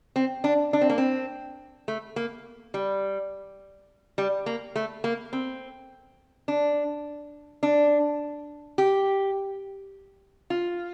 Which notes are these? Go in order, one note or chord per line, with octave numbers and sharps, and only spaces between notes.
C4
D4
D4
C4
A#3
C4
A3
A#3
G3
G3
A#3
A3
A#3
C4
D4
D4
G4
F4